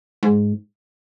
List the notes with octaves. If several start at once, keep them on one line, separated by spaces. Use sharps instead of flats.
G#2